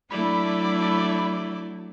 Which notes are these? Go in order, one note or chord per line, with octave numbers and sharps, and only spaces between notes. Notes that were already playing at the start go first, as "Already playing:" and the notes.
F#3 A3 D4 E4 D5 B5